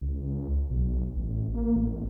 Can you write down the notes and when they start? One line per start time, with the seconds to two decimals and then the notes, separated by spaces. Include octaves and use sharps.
0.01 C#2
0.70 B1
1.16 A1
1.54 A#3
1.76 A1